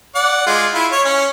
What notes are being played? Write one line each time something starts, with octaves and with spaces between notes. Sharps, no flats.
D5 F#5
G#3 F4
E4 F4
C#5
C#4